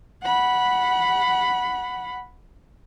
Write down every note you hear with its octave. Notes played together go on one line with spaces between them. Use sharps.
F#5 B5